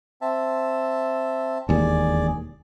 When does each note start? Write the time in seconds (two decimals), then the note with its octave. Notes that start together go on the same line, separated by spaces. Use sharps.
0.21 C4 E5 A5
1.69 E1 D#2 G#4 D5